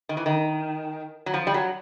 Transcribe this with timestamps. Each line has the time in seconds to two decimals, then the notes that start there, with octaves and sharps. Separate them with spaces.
0.09 D#3
0.17 E3
0.26 D#3
1.26 F#3
1.34 F3
1.47 G3
1.54 F#3